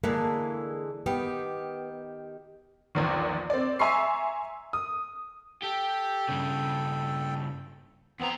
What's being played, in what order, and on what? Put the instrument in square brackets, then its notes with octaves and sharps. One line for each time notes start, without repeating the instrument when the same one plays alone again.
[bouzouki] D3 E3 G#3 [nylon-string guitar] A#3
[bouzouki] D#3 G4 [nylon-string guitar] B3
[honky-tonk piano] A#1 E2 D#3
C4 D5
E5 G#5 A#5 C6 C#6 C7
D#6
[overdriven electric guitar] G4 [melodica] A4 G5
[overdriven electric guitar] G2 C#3
[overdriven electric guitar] E2 A#5 [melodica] B3 C4